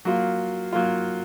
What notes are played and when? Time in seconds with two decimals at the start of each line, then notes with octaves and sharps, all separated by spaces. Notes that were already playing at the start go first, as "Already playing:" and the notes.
0.05 F#3 A#3 F4
0.72 F#3 A#3 F4